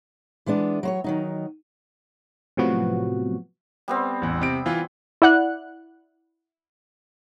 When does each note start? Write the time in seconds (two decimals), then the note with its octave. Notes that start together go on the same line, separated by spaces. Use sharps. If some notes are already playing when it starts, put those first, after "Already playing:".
0.46 E3 G#3 B3 D4
0.83 F#3 C5 C#5
1.04 D#3 F#3 D#4
2.57 A2 C3 F3 F#3 B3 F#4
3.88 G3 B3 C4
4.22 A1 E2
4.42 C3 D7
4.66 E3 F4
5.22 E4 D5 F#5 F#6